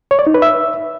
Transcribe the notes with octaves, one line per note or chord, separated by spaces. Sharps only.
C#5
D5
D#4
B4
E5